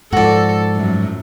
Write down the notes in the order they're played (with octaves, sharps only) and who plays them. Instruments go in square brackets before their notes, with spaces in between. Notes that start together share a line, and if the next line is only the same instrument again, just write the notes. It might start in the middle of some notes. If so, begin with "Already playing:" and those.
[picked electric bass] G#2 F3 [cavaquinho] F#4 D5 [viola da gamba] A4
[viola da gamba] F#2 A2 F#3